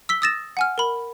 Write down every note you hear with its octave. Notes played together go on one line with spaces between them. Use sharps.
E6 B6 G7
D#6 E6 A6 A#6 E7
F#5 G#5 F6
A#4 B5